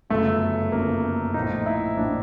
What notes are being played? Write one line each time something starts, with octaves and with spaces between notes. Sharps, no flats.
G1 F#2 C#3 A3
G1 F#2 C#3 A#3
A#1 A2 F3 D#4
E4
A#1 A2 F3 D4